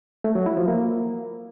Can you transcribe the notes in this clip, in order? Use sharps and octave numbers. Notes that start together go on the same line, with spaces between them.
A3
F#3
E4
F3
A#3